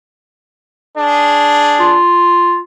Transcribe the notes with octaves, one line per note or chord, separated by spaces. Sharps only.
D4 G#4
F4